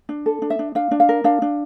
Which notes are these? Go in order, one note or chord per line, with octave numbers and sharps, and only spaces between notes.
D4
A4
D4
E5
D4
D4 F5
D4
F5
A#4
D4 F5
D4